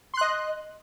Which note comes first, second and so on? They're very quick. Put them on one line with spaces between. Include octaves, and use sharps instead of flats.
C6 F#6 D#5